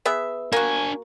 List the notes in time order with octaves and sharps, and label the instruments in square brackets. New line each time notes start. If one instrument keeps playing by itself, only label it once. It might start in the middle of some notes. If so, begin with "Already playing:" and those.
[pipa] B3 G#4 E5
[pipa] A#3 F#4 [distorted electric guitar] D4 G#5